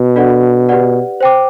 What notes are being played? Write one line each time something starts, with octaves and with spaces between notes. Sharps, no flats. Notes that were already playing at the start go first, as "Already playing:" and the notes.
Already playing: B2
D4 F#4 A4 D5 F#5
G4 B4 D5 F#5
C5 G5 D6